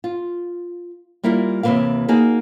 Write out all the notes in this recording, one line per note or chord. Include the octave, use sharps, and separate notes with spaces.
F4
G3 A#3 E4 F4 A#4
D#2 C3 D#3 E3 A#3 F5
A#3 D#4 F#4 G#4